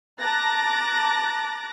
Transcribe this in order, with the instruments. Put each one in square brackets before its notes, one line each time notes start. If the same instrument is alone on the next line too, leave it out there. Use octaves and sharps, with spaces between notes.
[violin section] A5 A#5 D6 F#6 A6 A#6